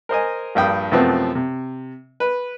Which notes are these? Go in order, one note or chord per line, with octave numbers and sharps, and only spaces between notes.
A#4 C5 D#5 G#5
A#1 G2 G5 D#6
F#2 C3 F3 A3 B3 C4
C3
B4